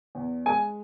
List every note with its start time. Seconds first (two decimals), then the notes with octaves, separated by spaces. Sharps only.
0.15 E2
0.46 G#3 G#5